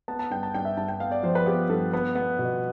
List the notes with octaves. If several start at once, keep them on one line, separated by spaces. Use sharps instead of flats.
B3 A5
A5
G2 G5
A5
G2 G5
E5
G2 A5
G5
B3 F5
D5
F3 C5
B4
B3 G4
G2 A4
B3 B4
B3
B2